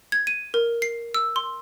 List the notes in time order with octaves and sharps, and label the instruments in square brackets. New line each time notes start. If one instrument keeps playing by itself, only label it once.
[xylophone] G#6
D#7
A#4
C7
E6
C6